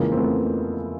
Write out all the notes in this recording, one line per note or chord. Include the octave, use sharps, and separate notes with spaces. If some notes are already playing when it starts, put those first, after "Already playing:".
Already playing: F2 C#3 E3 G#3 A#3
C4
A3 B3